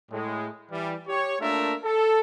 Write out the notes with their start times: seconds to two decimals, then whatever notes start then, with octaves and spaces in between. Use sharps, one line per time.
0.11 A2 G#3
0.71 E3 G3
1.08 G4 C#5
1.40 A3 A#3 D4 F4 A#4 E5
1.84 A4